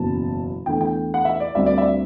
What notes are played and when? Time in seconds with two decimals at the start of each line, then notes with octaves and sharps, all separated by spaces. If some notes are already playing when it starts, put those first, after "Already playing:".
Already playing: F#1 E2 B2 F#3 A5
0.66 E2 D3 A3 G5
0.81 G5
1.14 F#5
1.25 E5
1.40 D5
1.55 D2 D3 G3 C4 E5
1.66 D5
1.78 E5